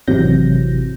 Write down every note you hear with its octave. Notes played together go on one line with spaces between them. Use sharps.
G#1 C3 E3 F#3 G6 A#6